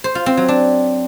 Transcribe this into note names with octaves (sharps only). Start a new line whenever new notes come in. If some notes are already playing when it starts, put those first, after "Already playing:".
C5
F4
C4
F#3
D4